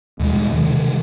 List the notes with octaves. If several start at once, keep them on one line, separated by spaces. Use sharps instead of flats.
D#2 B2 G3 G#3
C3 D#3 E3